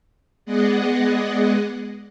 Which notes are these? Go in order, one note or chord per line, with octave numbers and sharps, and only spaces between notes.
G#3 B3 G#4 D5 D#5 F#5